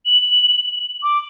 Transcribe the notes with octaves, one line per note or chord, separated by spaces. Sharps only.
F#7
D6